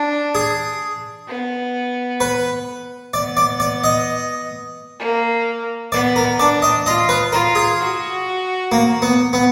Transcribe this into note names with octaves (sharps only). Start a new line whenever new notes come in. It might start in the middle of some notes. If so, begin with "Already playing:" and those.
Already playing: D4
G#4
B3
B4
B3 D5
D5
D5
D#5
A#3
B3 D5
A#4
D4 D5
D#5
F4 D#5
B4
F4 A#4
G#4
F#4
A#3
B3
B3